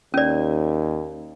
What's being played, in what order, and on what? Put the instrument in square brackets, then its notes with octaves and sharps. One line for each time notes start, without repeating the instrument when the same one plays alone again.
[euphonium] D#2 [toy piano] C#4 D5